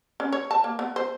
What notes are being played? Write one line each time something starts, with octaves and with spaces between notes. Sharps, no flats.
C#4
C#5
A5
A#3
B3
C5